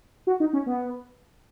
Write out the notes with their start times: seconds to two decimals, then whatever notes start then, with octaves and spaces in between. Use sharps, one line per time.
0.27 F#4
0.40 D#4
0.53 C#4
0.66 B3